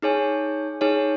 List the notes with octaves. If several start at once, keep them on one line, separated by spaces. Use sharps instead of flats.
D#4 G#4 C#5 G#5
D#4 G#4 C#5 G#5